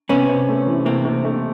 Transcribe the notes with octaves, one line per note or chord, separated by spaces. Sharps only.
C3 B3 C#4
C3
A3
E3
C3 A#3 C4
C3
A3